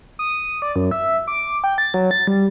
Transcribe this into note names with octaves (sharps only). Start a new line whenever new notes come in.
D#6
D5
F#2
E5
D6
G5
A6
F#3
A6
G3